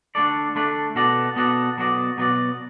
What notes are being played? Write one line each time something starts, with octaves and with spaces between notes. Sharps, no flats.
D3 A3 D4 A4 D5
D3 A3 D4 A4 D5
B2 B3 F#4 A4 D5
B2 B3 F#4 A4 D5
B2 F#3 B3 F#4 D5
B2 F#3 B3 F#4 D5